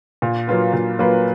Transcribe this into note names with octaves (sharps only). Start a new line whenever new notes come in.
A#2
F#3 A#3 F4 B4
A#2
F#3 A#3 F4 B4